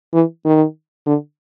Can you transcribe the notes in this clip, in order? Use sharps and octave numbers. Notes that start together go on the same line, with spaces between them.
E3
D#3
D3